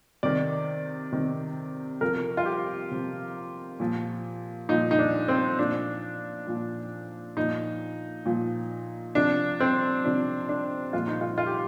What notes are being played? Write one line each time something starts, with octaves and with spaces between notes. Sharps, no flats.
C3 D#3 D5
C3 D#3
C3 F3 A#4
F4
G4
C3 F3
A#2 F3
A#2 F3 D#4
D#4
D4
C4
A#2 F3 D4
A#2 F3
A#2 F3 D#4
A#2 F3
C3 F3 D4
C4
C3 F3 D4
D4
A#2 F3 F4
D#4
F4
F4
G4